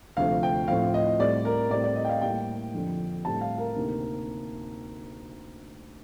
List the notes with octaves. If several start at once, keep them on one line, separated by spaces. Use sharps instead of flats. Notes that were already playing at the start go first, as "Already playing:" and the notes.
D2 C3 F3 A3 F5
G5
A2 F3 C4 F5
D#5
A2 G3 C4 D5
A#4
A2 G3 C4 D5
D5
D#5
G5
F5
A2 G3 A#3 G5
F2 D3 F3
A2 G3 C4 A5
F5
A#4
D2 C3 D#3 A#3